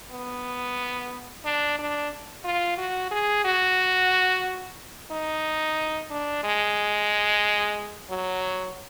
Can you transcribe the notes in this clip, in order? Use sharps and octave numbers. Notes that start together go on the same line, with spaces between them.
B3
D4
D4
F4
F#4
G#4
F#4
D#4
D4
G#3
F#3